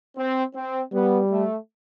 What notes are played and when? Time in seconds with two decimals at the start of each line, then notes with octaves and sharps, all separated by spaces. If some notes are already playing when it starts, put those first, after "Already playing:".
0.17 C4
0.55 C4
0.93 G3 B3
1.31 A3